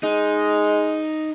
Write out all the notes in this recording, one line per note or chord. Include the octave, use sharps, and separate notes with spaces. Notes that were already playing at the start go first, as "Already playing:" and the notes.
G#3 D#4